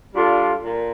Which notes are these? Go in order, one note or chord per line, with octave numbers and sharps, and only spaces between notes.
G3 D4 F4 A4
A#2